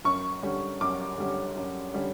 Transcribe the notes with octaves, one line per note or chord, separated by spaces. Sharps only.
F#2 C#6
D3 G3 C#4
F#2 D6
D3 G3 C#4
F#2
D3 G3 C#4